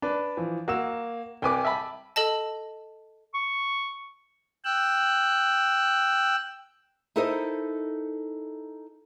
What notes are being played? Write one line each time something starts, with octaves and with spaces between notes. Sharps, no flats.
D4 B4
E3 F3
A#3 F#4 E6 E7
C2 B4 G5 G#5 D6
E5 A5 B5
A4 D#5 A5
C#6
G5 E6 F#6
D#4 E4 A4 A#4 C5 D#5